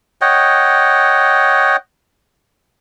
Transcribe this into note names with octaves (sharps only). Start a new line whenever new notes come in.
C#5 D#5 F#5 G5